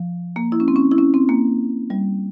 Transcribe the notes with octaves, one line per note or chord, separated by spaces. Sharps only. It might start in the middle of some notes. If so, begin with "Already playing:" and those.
Already playing: F3
A#3
E4
C#4
C4
C#4
E4
C#4
C4
A#3
G3